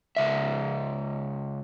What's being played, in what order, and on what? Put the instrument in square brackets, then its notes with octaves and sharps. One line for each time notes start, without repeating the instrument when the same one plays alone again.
[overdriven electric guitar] C#2 E5